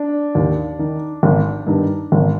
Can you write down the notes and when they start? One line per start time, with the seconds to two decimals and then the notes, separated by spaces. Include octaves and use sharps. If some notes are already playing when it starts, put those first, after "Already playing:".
Already playing: D4
0.35 D#2
0.79 D#3
1.23 G#1
1.67 G2 D#3
2.12 G#1